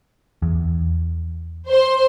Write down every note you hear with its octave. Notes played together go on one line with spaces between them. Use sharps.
E2
C5 C6